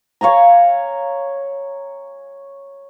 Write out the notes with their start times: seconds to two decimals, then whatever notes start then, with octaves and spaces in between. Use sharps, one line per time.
0.21 C#5 F5 G#5 A#5